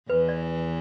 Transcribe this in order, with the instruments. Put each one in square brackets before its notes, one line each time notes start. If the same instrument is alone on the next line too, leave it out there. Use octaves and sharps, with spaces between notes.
[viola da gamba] E2 E3 [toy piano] B4
[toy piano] D5